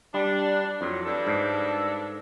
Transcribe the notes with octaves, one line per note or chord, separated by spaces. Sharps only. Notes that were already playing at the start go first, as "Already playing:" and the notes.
G3 D4
F2 A2 F#3
G2 D4 A4
G#2